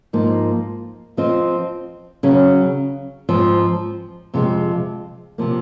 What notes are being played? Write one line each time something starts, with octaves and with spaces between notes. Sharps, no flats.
G#2 F3 A#3 D#4
F3 C4 F4 C5 D#5
C#3 F#3 C#4
G#2 F3 C4
F2 C3 F3 G#3 C4
C3 F3 A#3